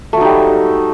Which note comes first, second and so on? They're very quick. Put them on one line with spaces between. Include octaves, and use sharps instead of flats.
A3 F#3 D#4 G3